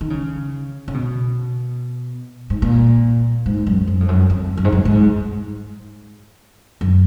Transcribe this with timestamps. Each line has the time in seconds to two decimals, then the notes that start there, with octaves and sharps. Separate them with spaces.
0.01 D#3
0.10 C#3
0.88 C#3
0.94 B2
2.50 G#2
2.62 A#2
3.46 G#2
3.67 F#2
3.87 F#2
4.00 F2
4.08 F#2
4.30 F2
4.57 F#2
4.64 G#2
4.72 F#2
4.85 G#2
6.81 F#2